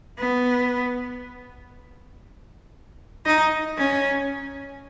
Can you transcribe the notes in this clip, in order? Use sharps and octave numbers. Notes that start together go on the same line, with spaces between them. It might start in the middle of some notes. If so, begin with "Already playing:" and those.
B3
D#4
C#4